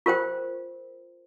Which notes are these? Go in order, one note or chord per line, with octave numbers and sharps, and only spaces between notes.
F4 A#4 C5 G5